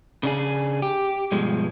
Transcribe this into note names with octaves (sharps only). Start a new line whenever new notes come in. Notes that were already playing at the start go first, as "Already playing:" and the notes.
C#3 D4 G#4
G4
G2 B2 F3 G#3